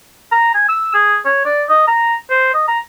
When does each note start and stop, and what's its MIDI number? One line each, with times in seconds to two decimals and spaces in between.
0.32 0.52 82
0.54 0.68 80
0.69 0.90 88
0.94 1.18 68
1.25 1.43 73
1.46 1.63 74
1.69 1.86 75
1.88 2.15 82
2.30 2.50 72
2.54 2.63 75
2.68 2.79 82